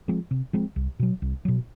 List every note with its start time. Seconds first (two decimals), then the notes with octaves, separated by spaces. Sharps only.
0.08 F3 G#3 C4
0.31 C3
0.53 F3 G#3 C4
0.76 C2
0.99 B2 F#3
1.22 C2
1.45 B2 F#3